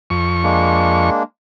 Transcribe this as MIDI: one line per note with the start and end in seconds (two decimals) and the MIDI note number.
0.10 1.10 41
0.10 1.10 85
0.43 1.23 56
0.43 1.23 58
0.43 1.23 62